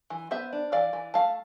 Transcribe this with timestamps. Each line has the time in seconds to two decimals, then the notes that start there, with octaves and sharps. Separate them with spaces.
0.10 E3
0.31 B3 C5 E5
0.53 D4
0.72 E3 D5 F5
0.93 E3
1.14 A3 F5 A5